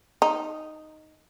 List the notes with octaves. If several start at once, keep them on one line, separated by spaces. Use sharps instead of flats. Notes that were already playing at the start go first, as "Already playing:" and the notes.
D#4